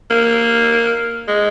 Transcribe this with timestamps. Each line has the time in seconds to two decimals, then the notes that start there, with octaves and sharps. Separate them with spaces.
0.10 A#3
1.28 G#3